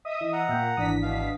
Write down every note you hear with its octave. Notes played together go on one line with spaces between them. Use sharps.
D#5 E5 D#6
E3
F#5 A#5
A#2 A#3 E5 G5
G#1 E3 D4 D#6 B6
B2 F5